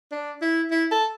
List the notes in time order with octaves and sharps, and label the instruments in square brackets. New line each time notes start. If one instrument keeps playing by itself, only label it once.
[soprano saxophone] D4
E4
E4
A4